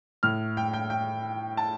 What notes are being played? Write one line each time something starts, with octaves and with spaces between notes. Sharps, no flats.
A2 F6
G5
G5
G5
A5